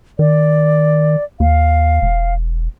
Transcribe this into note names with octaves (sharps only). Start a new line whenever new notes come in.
D#3 D5
D#2 F5
E1